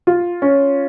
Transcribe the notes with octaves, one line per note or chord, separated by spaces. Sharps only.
F4
C#4